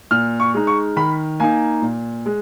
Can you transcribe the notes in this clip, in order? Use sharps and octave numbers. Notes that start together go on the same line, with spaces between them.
A#2 F6
C#6
G#3 D#4
C#6
D#3 B5
A#3 D#4 G#5
A#2
G#3